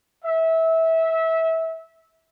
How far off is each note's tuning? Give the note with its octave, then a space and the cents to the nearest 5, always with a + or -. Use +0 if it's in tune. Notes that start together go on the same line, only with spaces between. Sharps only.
E5 -20